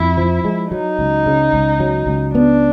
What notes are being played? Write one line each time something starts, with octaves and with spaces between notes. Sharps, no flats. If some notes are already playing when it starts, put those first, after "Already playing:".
Already playing: F2 E4
F3
G#3
F#3 D#4
C#2
C#3
C#2
F#3
C#2
B3 D4